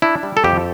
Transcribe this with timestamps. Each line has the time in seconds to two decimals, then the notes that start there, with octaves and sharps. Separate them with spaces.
0.02 D4 E4
0.23 G3
0.37 A4
0.44 F2 G4